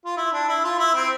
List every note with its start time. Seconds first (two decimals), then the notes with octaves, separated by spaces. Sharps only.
0.06 F4
0.17 E4
0.33 D4
0.48 E4
0.64 F4
0.79 E4
0.95 C4